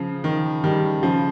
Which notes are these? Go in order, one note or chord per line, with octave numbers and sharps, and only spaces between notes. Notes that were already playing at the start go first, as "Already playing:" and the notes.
Already playing: C#3 F3
D#3
D#3 G3
C#3 F3